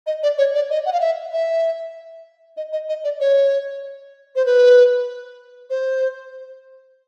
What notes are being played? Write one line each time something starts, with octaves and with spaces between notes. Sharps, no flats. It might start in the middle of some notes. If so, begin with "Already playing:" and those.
D#5
D5
C#5
D5
D#5
F#5
F5
E5
E5
D#5
D#5
D#5
D5
C#5
C5
B4
C5